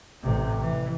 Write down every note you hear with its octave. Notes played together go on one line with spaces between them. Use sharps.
A1 C3
E3